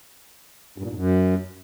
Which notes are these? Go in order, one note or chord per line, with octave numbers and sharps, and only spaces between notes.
G2
A#2
G#2
F#2